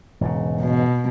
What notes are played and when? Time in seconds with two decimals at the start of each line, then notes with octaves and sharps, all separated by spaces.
0.21 E1 G#2 C#3
0.61 B2